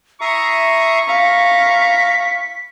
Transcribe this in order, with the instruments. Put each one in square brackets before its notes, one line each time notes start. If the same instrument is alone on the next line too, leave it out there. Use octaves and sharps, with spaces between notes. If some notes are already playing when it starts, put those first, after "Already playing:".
[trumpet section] E4 C#6 [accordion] E5 A#5 D#6 [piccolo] C7
[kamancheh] F5 [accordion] A#5 [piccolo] B6